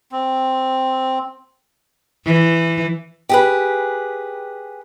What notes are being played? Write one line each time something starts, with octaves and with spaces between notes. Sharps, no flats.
C4
E3
G4 G#4 B4